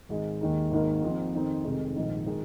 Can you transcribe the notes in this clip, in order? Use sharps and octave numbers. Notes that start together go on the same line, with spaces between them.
G#1 G#2 G#3
D#2 D#3 G#3 D#4
G#1 G#2 D#3 A#3
G#2 F3 C4
F2 D#3 C4 D#4
F1 F2 C3 D#3 G#3
A#1 G#2 D#3
D#3 G#3